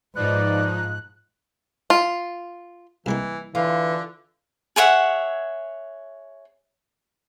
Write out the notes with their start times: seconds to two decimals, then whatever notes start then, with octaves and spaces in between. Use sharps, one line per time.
0.16 G#2 F3 D#4 B4 D5 F#6
1.90 F4
3.06 C2 E3 G#3 A#3
3.55 D3 E3 F4
4.76 G#4 C#5 E5 F#5